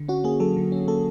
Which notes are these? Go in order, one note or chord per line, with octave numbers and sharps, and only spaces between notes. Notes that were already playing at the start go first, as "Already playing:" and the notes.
Already playing: D3
C#4 F#4
A#3 G#4
F#3 A4
D3
C#4
A#3 A4